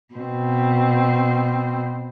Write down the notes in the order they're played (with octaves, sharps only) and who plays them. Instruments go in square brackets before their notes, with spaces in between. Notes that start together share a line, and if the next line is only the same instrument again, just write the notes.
[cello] B2 C4